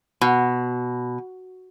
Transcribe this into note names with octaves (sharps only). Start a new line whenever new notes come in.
B2